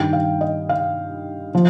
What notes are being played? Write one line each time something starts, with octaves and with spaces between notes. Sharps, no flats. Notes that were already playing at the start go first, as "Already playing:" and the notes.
Already playing: G2 D#3 G3 G5
F5
D#5
F5
F3